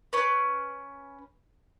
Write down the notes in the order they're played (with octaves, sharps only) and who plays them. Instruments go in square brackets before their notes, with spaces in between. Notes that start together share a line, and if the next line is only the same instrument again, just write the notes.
[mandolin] C#4 B4